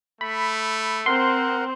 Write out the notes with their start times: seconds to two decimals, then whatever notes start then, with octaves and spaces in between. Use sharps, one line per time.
0.21 A3 B5
1.06 C4 A#4 F#5 C6